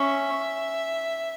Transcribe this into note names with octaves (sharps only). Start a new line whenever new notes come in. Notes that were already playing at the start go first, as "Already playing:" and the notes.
Already playing: C#4 E5